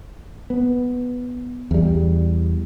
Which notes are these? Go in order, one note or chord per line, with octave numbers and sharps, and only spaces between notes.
B3
E2 G3